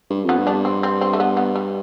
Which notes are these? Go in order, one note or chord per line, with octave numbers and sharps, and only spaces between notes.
G2
F2
B3
G2
B3 D4
C4
C4
C4
A3
B3
B3
G3